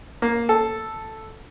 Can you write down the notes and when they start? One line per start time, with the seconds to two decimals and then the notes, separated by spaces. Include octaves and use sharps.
0.22 A#3
0.49 A4